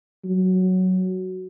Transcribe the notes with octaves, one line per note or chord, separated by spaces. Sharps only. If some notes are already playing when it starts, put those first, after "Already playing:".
F#3